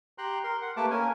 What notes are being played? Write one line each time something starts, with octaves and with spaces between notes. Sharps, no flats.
G4 G5 A#5 C6 F#6
A#4 C6
F#5
A3 A#3 G4 B4 A5 D6
A#3 C#4 A#4 G#5